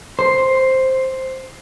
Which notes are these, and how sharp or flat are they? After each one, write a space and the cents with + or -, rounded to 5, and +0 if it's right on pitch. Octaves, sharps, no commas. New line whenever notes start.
C5 +5